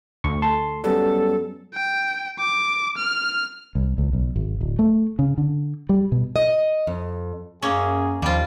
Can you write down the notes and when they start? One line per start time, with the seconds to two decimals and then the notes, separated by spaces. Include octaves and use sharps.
0.24 D2 C#6
0.42 A4 A5 C6
0.84 F#2 G3 B3 C#4 A4
1.74 G5
2.39 D6
2.97 F6
3.75 C2
3.98 C#2
4.13 B1
4.36 G#1
4.61 D1
4.79 A3
5.19 C#3
5.38 D3
5.89 G3
6.12 B2
6.36 D#5
6.87 F2
7.62 F#2 A#3 C#4 G#4
8.22 D#2 F3 G3 F4